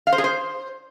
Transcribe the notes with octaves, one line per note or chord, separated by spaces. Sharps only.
F5
C5
G#4
C5